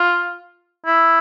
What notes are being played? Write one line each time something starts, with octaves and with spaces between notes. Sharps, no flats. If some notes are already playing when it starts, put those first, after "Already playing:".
Already playing: F4
E4